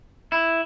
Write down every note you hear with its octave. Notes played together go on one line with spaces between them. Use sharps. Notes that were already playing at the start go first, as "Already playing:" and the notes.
E4